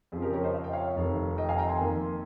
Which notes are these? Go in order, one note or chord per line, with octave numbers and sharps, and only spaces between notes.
F2 C#3 F3 G#4
G4 A#4
A#4 C#5
C5 D#5
F5
G5
C#5 F5
F1 F2 D#3
D#5 G5
F5 G#5
G5 A#5
G#5 C6
F2 D#3 A#3